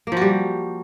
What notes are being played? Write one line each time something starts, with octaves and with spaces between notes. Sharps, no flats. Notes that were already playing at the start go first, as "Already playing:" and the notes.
F3 G3 A#3 F#4